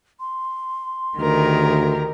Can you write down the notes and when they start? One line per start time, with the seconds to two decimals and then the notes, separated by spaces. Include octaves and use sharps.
0.20 C6
1.18 D2 D#3 G4 A#4